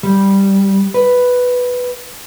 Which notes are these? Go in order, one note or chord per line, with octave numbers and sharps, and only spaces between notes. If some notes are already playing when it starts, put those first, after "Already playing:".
G3
B4